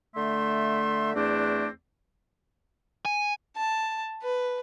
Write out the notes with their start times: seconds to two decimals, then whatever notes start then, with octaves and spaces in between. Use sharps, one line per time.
0.15 D3 A3 E5 C6
1.14 E2 A3 C4 D4
3.05 G#5
3.56 A5
4.22 B4